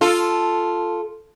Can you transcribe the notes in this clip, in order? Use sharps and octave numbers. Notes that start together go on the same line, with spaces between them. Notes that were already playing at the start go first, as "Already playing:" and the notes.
F4 A4